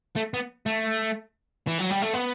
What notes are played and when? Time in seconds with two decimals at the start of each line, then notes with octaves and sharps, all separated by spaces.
0.16 A3
0.34 B3
0.66 A3
1.67 E3
1.79 F#3
1.91 G3
2.03 A3
2.14 B3